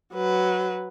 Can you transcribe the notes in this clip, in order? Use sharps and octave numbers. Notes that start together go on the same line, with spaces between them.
F#3 B4